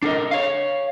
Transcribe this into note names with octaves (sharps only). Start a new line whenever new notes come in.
D4 A4 A#4 D#5
C#5 F5